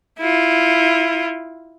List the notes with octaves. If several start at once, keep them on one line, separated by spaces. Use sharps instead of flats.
E4 F4